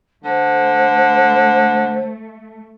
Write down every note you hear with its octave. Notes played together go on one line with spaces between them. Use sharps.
D3 A3 C5